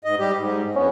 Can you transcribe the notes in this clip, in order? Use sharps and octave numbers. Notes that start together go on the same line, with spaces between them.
G#2 D#5
G3 G4
G#2
F2 B3 C#4